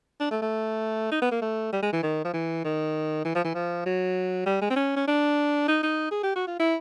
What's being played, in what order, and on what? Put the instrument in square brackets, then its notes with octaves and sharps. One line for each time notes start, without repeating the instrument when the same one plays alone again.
[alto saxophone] D4
A3
A3
D#4
B3
A#3
A3
G3
G#3
E3
D#3
F3
E3
D#3
E3
F3
E3
F3
F#3
G3
G#3
C4
C#4
C#4
D4
D#4
D#4
G#4
G4
F#4
F4
E4